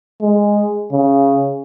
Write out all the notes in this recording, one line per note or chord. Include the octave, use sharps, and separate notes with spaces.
G#3
C#3